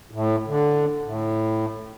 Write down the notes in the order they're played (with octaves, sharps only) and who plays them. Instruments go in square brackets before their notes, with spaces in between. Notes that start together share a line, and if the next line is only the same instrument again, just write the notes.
[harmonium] A2
D3
A2